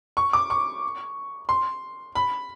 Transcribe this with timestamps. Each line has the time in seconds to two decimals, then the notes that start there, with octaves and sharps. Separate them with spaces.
0.17 C#6
0.33 D6
0.50 C#6
1.49 C6
2.15 B5